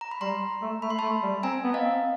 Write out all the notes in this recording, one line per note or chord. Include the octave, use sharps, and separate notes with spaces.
A#5
B5
G3 A#5 C6
A3
A3 B5
C6
A3 A5 B5
G3
C4 G#5 A#5
B3
D#5 F5
C4